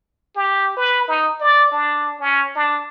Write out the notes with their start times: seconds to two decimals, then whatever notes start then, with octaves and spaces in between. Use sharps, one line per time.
0.36 G4
0.77 B4
1.08 D#4
1.40 D5
1.71 D4
2.20 C#4
2.56 D4